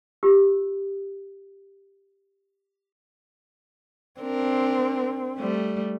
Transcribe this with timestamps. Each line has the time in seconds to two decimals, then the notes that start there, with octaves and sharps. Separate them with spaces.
0.23 F4 G4 E6
4.21 C4 D4 A#4
5.38 G3 A3